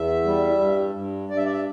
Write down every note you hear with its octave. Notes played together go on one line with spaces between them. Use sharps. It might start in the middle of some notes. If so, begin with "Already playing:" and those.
Already playing: E2 E5
G3
G2
G2
G2 D5
E5
D5
E5